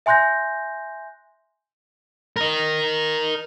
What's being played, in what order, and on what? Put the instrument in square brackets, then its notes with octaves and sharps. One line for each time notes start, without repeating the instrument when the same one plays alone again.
[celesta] E5 G#5 C6 F#6 G6 A#6
[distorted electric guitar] A#4 D#5